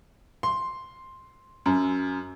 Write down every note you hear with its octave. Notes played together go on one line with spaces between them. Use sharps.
C6
F#2